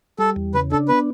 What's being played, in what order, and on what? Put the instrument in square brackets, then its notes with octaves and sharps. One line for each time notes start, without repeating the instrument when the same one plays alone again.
[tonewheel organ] G3 [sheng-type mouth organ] A4
[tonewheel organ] E2
[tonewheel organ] C#3 [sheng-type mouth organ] B4
[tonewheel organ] D4 [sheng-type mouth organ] A4
[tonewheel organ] B3 [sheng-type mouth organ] B4